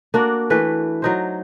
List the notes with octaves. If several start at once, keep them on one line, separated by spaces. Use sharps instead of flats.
A#3 D4 F#4
E3 A3 B4
F#3 D#4 C5